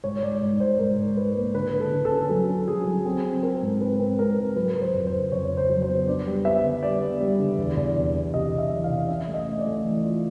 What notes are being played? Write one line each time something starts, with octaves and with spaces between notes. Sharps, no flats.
G#2 C#5
G#2 D5
G#2 D5
G#2 C5
G#2 A#4
G#2
G#2 B4
A#3
D3 B4
D3
A4
D3
A4
C#4
F#3 A4
C#4
F#3 G#4
F#3
C4 A4
C4
C4 A#4
G#2
C4 B4
C4
G#2 A#4
G#3
F#3 B4
F#3
C5
F2
C5
C#3
F2 C#5
C#3
C5
F#3
C5
B3
D4 D5
G3
B3 E5
D3
G3 D5
B3
G3
D3
E2
E2
C3
E2
C3 D#5
C3
E5
E3
F5
C3
C#4 E5
A3
D#5
C#4
D5
A3
E3
F4